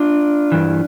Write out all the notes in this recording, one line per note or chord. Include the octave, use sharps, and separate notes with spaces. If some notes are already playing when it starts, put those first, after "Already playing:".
Already playing: D4 F4
G2 E3